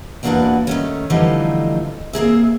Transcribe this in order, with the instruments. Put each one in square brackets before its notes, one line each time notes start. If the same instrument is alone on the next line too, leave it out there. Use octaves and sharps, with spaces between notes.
[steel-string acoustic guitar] E2 F#3 A#3 D4 F#4 B4
D#3 A3 C#4
D3 E3 F3 G3 A3 D#4
A#3 C4 G#4 E5